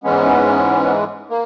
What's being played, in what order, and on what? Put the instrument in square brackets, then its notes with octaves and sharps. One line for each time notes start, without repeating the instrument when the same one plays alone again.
[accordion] G#2 E3 G#3 B3 C#4
A#3